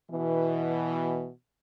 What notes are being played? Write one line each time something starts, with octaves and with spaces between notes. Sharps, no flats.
B2 E3